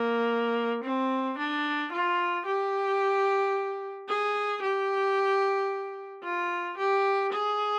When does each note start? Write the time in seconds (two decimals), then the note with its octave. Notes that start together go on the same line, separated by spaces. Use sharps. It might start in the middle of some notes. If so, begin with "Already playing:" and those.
Already playing: A#3
0.84 C4
1.38 D4
1.92 F4
2.46 G4
4.08 G#4
4.62 G4
6.24 F4
6.78 G4
7.33 G#4